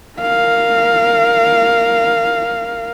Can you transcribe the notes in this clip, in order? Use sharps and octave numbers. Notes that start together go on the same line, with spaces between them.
A#4 F5